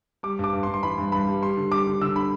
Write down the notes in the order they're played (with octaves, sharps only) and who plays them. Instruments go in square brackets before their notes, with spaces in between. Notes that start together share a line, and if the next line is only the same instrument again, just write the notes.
[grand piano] G3 D6
G2 D6
G2
C6
G2
C6
E3 B5
G2
G2 B5
G3
G3 C6
D3
G3 D6
D3
D3 E6
D3 B5